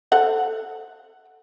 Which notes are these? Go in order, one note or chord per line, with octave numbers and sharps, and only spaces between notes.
A4 C5 F#5